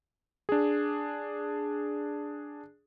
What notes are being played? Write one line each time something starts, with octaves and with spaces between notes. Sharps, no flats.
D4 G#4